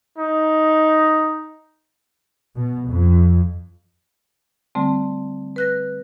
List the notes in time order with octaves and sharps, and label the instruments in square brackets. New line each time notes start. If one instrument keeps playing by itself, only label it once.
[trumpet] D#4
[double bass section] B2
F2
[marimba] D3 G3 A3 C4
B4 F#6 A#6